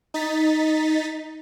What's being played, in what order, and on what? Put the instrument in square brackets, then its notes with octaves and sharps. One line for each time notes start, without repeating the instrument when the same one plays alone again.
[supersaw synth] D#4 A6 B6